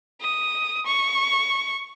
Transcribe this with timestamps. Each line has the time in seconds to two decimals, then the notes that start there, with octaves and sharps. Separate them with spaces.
0.21 D#6
0.86 C#6